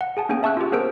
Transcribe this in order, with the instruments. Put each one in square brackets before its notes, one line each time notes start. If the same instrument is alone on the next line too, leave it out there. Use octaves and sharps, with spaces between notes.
[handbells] F#5
G#4 G#5 A5
A#3 B3 C#4 G#4 G5 G#5
E5 A5 C#6 E6 F#6
F4 G4
B3 G#4 A#4 C5 E6 D7